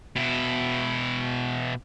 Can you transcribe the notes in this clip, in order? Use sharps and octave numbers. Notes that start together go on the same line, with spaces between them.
B2 E4